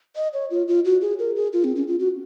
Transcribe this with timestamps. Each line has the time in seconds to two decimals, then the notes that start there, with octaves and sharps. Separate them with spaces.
0.16 D#5
0.33 C#5
0.51 F4
0.68 F4
0.85 F#4
1.02 G#4
1.19 A#4
1.36 G#4
1.53 F4
1.64 C4
1.76 C#4
1.88 F4
2.00 F#4